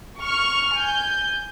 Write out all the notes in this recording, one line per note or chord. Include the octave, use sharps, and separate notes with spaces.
C#6 F6
G#5 G6